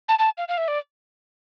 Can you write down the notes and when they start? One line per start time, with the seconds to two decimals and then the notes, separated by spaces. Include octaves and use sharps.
0.09 A5
0.19 A5
0.38 F5
0.48 F5
0.58 E5
0.68 D5